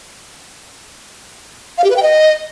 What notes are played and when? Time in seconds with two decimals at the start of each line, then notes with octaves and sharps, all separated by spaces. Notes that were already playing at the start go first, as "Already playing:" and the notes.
1.78 F5
1.84 G4
1.90 B4
1.96 G5
2.03 D#5